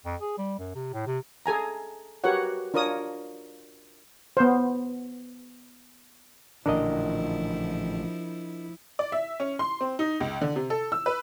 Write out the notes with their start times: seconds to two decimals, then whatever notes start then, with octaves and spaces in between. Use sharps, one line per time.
0.05 F2
0.21 G#4
0.38 G3
0.59 F#2
0.75 C3
0.93 A2
1.07 C3
1.46 G#4 A4 G#5 A#5
2.24 F#4 G4 A#4 B4 C#5 F#5
2.74 D4 F4 A#4 C#5 D#6
4.37 B3 C5
6.66 A1 A#2 D3 F3 D4 E4 A#4 D#5
8.99 D5
9.12 E5
9.40 C#4
9.59 C6
9.81 C4
9.99 D#4
10.20 C#2
10.41 D3
10.56 C3
10.70 A4
10.92 E6
11.06 B4